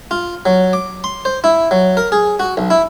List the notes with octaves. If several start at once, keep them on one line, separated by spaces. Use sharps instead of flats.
F4
F#3
D6
C6
C5
E4
F#3
A#4
G#4
F#4
B1
E4